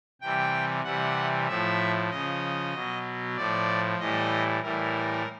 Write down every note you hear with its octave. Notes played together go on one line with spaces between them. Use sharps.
C3 E3 G3 G5
C3 E3 G3 F#5
A2 F3 E5
C#3 F3 D#5
B2 F#3
A2 F3 D5
A2 E3 G3 D#5
A2 E3 G3 A#4